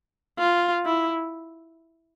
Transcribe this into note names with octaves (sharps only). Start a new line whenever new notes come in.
F4
E4